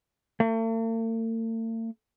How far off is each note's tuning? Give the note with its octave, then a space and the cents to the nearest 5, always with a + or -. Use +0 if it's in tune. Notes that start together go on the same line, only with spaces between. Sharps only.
A3 +45